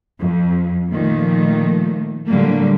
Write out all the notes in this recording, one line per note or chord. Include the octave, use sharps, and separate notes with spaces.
F2
A#2 D#3 F3 A3
A2 D3 F#3 G3 A#3